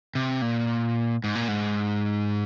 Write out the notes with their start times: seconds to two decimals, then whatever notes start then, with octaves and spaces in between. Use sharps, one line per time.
0.15 C3
0.42 A#2
1.24 G#2
1.35 A#2
1.48 G#2